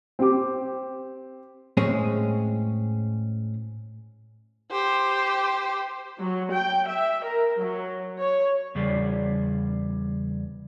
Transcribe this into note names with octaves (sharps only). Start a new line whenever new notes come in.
C4 G4 D6
A2 G#3 C4 C#4 G#4
G4 C5
F#3
G5
E5
A#4
F#3
C#5
E2 C#3 G3 G#4 D5